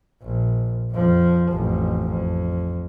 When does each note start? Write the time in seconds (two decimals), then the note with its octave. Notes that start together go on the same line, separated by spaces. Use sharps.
0.22 A#1
0.91 F2 F3
1.48 A1 F2
2.05 F2